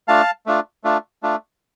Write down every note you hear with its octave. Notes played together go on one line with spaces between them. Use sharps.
A3 D4 F4 F5 A5
A3 D4 F4
A3 D4 F4
A3 D4 F4